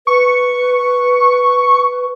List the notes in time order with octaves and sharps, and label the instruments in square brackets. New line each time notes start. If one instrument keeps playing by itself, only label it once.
[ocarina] B4 [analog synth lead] C#6